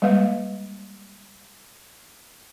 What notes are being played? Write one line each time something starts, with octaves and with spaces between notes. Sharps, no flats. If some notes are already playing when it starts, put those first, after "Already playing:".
G3 G#3 A#3 B4 F5